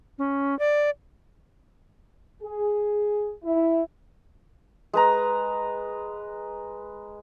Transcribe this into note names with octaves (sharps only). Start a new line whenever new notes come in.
C#4
D5
G#4
E4
G#3 B4 A#5